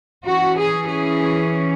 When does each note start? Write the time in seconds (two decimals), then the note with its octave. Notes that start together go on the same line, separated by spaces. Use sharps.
0.25 E3 C#4 F#4
0.57 G#4
0.89 G#4